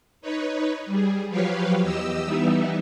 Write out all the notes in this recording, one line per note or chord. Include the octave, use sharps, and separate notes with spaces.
D#4 B4 C#5
G3 G#4
F3 F#3 G4 B4 C#5 F5
E2 G4 D#5 E6
E3 G3 B3 D#4 E4